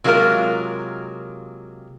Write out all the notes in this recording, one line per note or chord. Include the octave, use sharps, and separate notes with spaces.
C3 F#3 G#3 A#3 F4 A#4